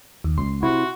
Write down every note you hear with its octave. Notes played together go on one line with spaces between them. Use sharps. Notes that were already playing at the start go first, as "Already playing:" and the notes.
D#2
C#2 C6
C3 E4 F#4